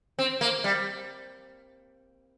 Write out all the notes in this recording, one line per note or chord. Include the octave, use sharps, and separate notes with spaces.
C4
A#3
G3